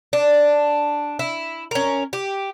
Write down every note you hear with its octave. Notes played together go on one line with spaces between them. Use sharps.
D4
E4
C#4 A#4
G4